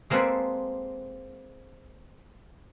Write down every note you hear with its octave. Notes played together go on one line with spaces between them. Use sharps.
G#3 A#3 C4 A4 B4 D5